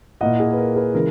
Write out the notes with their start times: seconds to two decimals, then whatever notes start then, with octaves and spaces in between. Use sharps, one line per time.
0.21 A#2 A#3 E4 D#5 F#5
0.40 G#4
0.52 B4
0.58 A#4
0.76 G#4 B4
0.94 C#3 E3 G#3 A#4